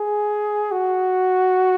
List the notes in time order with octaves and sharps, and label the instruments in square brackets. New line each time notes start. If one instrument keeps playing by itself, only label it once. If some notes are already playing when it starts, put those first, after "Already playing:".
Already playing: [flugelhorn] G#4
F#4